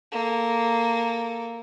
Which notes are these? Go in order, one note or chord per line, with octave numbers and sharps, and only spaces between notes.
A#3 A4